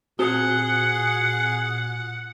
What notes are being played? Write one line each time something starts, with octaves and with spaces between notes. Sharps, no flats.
A#2 C4 F#4 G#4 F#5 G7